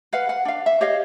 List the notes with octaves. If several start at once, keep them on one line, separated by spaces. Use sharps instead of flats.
B4 F5 F#5
F#5
D4 F5
E5
G4 C#5 D#5 F5